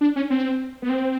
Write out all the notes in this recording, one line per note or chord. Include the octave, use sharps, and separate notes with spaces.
D4
C#4
C4
B3
C4